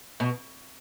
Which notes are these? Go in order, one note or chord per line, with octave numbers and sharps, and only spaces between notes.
B2